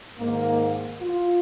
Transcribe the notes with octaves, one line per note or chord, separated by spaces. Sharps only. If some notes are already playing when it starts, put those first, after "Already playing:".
G#2 D#3 A#3
F4